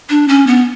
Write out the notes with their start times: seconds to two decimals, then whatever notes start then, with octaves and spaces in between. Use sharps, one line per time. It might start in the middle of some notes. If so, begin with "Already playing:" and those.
0.10 D4
0.28 C#4
0.47 B3